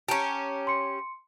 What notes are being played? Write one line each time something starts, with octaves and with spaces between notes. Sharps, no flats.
C#4 G4 A5 A#5
C6 C#7